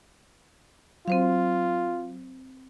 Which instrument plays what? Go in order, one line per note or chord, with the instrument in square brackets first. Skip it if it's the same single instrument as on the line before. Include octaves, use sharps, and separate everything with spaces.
[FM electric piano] F#3 [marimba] C4 C5 F5 [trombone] F4